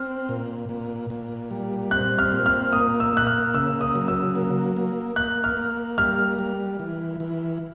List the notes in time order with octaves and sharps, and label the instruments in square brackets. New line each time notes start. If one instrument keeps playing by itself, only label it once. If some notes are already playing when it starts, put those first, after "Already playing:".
Already playing: [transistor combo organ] C4 [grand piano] F6
[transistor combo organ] A#2
A#2
A#2
G3
[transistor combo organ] C4 [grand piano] F#6
[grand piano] F6
[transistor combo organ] A#2
[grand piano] F6
[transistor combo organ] A#3 [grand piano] D#6
[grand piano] E6
[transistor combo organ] A#3 [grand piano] F#6
[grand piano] F6
[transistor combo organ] C#3 [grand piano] E6
[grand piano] D#6
[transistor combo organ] F#3
[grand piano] E6
[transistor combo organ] A#3
A#3
[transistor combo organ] A#3 [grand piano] F#6
[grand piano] F6
[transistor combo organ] A#3
[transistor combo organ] G3 [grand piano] F6
[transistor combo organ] G3
E3
E3